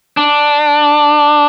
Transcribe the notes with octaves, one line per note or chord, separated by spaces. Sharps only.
D4